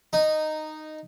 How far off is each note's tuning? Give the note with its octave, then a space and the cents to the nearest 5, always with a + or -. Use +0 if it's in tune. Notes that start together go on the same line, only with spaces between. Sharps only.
D#4 -5